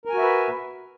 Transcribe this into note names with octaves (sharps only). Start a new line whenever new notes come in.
F#4 A#4 B4 E5 G#5